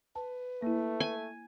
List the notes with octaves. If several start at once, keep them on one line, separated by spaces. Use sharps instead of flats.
B4 A5
A3 A#3 E4
G#5